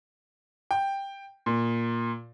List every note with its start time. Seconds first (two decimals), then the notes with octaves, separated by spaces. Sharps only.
0.71 G5
1.46 A#2